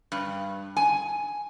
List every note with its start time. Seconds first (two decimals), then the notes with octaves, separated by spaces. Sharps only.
0.12 G2
0.77 G#5